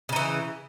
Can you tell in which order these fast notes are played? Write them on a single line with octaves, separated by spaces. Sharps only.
C#3 D#4 E3